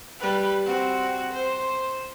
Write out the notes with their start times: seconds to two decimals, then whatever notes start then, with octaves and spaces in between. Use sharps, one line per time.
0.20 G3 B4
0.65 C4 F#4
1.33 C5